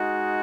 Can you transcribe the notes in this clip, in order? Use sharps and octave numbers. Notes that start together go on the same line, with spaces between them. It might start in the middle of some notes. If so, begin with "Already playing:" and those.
Already playing: G#3 D#4 F#4